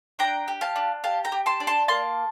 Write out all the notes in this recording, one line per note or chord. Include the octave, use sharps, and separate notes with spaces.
D4 G5 A#5
G4
F5 A5
D4
G4 F5 A5
G5 A#5
G4
A5 C6
D4
A5 C6
A#3 A5 C6